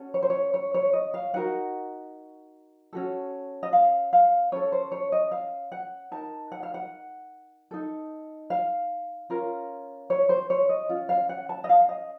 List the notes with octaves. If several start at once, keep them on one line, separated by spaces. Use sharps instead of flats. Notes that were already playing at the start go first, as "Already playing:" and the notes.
Already playing: C#4 F#4 A4
C#5
C5
C#5
C#5
C#5
D#5
F5
D#4 F#4 A#4 F#5
C#4 F#4 A4
D#5
F5
F5
C#4 A4 C#5
C5
C#5
D#5
F5
F#5
D#4 A#4 A5
F#5
F5
F#5
D#4 A4
F5
C#4 F4 A#4
C#5
C5
C#5
D#5
C#4 F4
F5
F#5
A5
D#5
F5
D#5